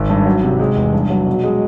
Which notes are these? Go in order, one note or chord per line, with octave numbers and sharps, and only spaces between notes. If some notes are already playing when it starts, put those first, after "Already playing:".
Already playing: G#1
G2
F#3
C3
G#3
E2
G2
F#3
B2
G#3